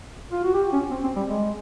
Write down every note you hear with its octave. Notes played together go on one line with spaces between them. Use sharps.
F4
F#4
G4
C#4
C4
C4
G3
G#3